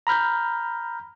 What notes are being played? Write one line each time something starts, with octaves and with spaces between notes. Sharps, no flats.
A#5 B5 F6 G6